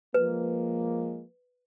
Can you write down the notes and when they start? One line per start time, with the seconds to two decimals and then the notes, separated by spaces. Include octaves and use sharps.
0.14 F3 G#3 A#3 B4